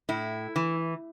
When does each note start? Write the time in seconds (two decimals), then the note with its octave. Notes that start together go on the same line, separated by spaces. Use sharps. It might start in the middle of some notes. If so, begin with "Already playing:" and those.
0.09 A2 E4
0.56 E3